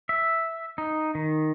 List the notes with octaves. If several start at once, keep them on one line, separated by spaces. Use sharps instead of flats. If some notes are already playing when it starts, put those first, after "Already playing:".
E5
D#4
D#3